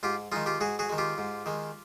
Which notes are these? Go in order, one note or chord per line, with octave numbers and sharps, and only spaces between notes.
G#2 F4 G4
D#3 G#3 D#4 F4
F4 G4
G#2 F#4 G#4
F#4 G#4
D#3 G#3
F4 G4
G#2
D#3 G#3